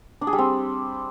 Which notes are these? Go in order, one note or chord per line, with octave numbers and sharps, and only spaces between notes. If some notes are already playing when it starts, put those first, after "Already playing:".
D4
G#4
G3
C4